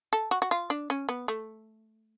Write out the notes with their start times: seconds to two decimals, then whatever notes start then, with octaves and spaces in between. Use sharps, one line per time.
0.13 A4
0.31 F#4
0.42 F#4
0.51 F4
0.70 D4
0.90 C#4
1.09 B3
1.28 A3